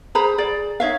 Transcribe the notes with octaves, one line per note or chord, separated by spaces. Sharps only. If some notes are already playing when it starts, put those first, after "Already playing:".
G#4 C5 A#5 B5
G#4 D5
D#4 C#5 E5 F5